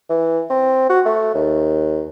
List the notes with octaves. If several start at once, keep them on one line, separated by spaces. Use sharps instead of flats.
E3
C4
F#4
A3
D#2